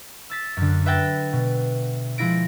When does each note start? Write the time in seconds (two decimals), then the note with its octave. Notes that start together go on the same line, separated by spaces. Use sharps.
0.30 E6 A6 B6
0.57 F#2 D3
0.86 B4 E5 F#5 G5 A6 A#6
1.33 B2
2.18 F3 G#3 E4 A#6 D7